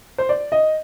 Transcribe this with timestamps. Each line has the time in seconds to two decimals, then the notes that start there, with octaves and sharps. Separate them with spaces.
0.18 C5
0.29 D5
0.52 D#5